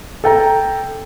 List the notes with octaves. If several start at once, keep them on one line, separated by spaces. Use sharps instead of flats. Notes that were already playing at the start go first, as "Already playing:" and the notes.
A4 G5 A#5